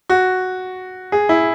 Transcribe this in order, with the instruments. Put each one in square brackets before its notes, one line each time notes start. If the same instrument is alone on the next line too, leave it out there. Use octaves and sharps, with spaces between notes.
[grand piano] F#4
G#4
E4